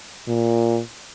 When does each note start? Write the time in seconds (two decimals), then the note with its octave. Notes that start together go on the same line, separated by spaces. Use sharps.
0.28 A#2